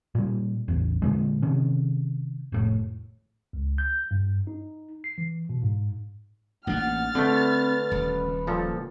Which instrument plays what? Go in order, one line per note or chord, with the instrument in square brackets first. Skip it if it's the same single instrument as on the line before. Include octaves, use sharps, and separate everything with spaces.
[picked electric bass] A#2 G3
A1 E2
A#2 D3 G#3
C3 D#3 C#4
F1 A2
[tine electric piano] C#2
G6
G2
D#4
C7
E3
B2
G#2
[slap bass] A1 A#3 D4 [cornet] F#5 [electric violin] F6 A6
[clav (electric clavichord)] D3 A3 [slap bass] C4 [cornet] B4
[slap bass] D#1
[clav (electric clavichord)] A#2 F3 A4